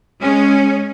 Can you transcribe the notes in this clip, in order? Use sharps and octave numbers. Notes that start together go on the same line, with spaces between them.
G#3 C#4